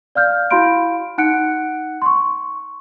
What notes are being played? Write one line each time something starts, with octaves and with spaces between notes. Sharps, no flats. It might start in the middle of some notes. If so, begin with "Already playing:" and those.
D5 F5 F6 G6
E4 F#4 F5 B5 C6 D7
D#4 F#5 F#6 C#7 D7
C6 C#6